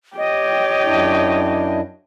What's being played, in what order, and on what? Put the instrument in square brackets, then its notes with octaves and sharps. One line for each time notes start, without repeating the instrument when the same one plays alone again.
[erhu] G4 [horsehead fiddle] C#5 G5 [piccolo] D#5
[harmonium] F#2 D4 E4